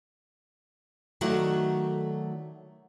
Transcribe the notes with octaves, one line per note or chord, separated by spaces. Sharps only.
D#3 F#3 A3 F#4 D5 F#5